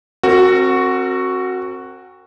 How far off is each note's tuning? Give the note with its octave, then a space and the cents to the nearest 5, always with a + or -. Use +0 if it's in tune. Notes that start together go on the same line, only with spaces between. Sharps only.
C4 +25 F#4 +0 A#4 -35